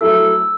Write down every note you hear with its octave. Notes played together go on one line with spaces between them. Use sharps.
F#3 A3 E4 A4 E6